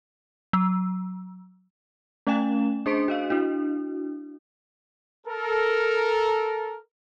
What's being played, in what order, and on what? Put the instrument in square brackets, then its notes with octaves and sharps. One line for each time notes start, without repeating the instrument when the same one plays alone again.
[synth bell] F#3
A3 C#4 F5 G5 G#5 E7
D4 G#4 C5 C6 B6 D7
F#4 D#5 F5
D4 E4 F#4
[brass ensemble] A4 A#4